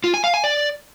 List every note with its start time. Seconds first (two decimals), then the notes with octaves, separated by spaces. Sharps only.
0.04 F4
0.14 G#5
0.24 F5
0.34 G#5
0.44 D5